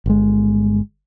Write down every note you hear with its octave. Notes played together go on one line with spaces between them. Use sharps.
G1 G#3